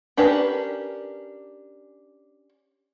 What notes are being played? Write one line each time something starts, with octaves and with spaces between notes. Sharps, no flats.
C#4 D4 G4 A#4 B4